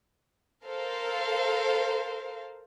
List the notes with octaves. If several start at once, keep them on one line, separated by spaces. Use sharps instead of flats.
A4 A#4 C5 F5